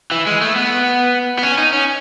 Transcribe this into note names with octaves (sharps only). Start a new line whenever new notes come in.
E3
G#3
A3
B3
B3
C#4
D#4
C#4